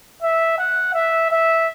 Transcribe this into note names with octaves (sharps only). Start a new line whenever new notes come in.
E5
F#5
E5
E5